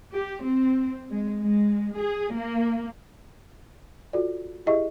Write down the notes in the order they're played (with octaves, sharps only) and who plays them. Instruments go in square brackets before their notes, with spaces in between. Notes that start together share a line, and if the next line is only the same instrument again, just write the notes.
[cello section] G4
C4
G#3
G#3
G#4
A#3
[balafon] F4 F#4 A4 D5
E4 G4 G#4 D#5 E5 C#6